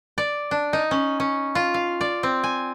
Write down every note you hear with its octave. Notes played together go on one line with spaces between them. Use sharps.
D5
D4
D#4
C#4
C#4
F4
F5
D5
C4
G#5